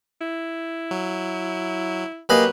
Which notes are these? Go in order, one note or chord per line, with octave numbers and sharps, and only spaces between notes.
E4
F#3
F#3 A#3 G4 B4 D#5 G#5